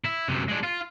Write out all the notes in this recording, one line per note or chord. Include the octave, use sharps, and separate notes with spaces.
E4
F#2 C3
G#3 D4
F4